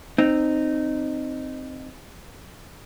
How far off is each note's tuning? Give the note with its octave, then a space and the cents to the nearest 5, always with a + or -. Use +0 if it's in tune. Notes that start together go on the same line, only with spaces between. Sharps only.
C4 +0 D#4 -15